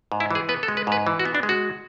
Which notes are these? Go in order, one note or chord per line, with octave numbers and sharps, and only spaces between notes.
G#2
E4
E3 G#4
B3 B4
A4
G#3
B4
G#2 B4
E3
F#4
B3
D4
G#3
F#4